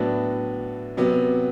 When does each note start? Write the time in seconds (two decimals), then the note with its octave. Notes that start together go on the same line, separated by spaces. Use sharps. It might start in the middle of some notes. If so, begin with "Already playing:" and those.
Already playing: A2 F#3 B3 D4
0.97 C3 F#3 B3